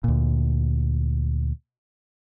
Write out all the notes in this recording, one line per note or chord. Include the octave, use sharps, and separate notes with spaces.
D2 A#2